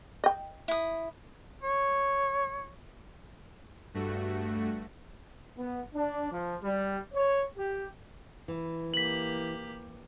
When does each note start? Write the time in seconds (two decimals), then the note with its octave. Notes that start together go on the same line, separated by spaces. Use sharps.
0.24 D#5 G5
0.68 E4 D#6
1.63 C#5
3.94 G2 A3 F#4
5.58 B3
5.95 D4
6.32 F3
6.62 G3
7.14 C#5
7.57 G4
8.48 E3
8.94 A#3 G4 B6 F#7